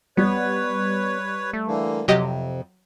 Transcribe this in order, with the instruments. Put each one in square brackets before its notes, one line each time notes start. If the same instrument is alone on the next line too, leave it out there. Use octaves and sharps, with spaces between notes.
[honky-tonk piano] G3 [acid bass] B3 [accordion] B4 C#5
[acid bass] A3
[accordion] D3 E3 A#3
[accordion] F2 [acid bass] C3 [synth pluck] F#3 G4 D#5